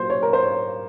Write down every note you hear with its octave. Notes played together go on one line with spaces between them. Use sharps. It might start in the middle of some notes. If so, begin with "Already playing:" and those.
Already playing: A#2 F#3 C5
C#5
A#4
C5
C#5